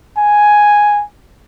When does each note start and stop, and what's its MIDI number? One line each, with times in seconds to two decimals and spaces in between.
0.17 1.03 80